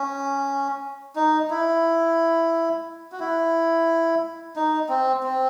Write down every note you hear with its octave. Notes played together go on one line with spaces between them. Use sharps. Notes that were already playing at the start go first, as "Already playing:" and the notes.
Already playing: C#4
D#4
E4
F#4
E4
D#4
C4
C4